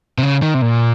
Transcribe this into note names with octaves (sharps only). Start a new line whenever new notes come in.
C3
C#3
D#3
C3
A#2